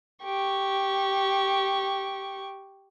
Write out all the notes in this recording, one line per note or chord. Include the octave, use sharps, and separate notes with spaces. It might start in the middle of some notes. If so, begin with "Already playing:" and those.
G4 C#6